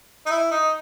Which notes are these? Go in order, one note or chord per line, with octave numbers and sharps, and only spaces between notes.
D#4
E4
D#4